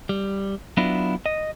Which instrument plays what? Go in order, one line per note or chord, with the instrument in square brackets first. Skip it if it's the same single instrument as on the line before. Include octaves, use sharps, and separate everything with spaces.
[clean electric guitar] G3
F#3 B3 D4 E4 F4
D#5